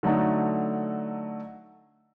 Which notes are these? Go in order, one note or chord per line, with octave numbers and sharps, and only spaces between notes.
D3 F#3 A3 D#4